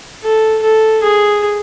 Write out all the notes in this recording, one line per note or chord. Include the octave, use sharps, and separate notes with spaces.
A4
A4
G#4